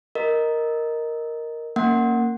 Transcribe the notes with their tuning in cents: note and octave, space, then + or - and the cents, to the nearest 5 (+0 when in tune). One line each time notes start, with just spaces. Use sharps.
A#4 +0 D#5 +0
A#3 -10 C#4 +0 F#5 +0